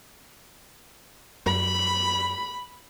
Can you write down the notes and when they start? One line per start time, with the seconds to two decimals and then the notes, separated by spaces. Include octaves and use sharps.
1.46 F#2 B5